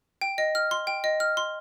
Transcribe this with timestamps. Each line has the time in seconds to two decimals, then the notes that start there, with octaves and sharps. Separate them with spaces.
0.21 G5
0.38 D#5
0.55 F6
0.71 C6
0.87 G5
1.04 D#5
1.20 F6
1.37 C6